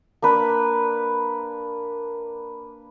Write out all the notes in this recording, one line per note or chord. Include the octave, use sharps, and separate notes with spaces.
A#3 D4 B4